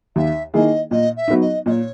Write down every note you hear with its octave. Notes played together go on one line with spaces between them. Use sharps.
D#2 E5
D#3 A#3 E4 G#4 D#5
A#2 D#5
E5
F#3 B3 D#4
D#5
A#2 C#5 D#5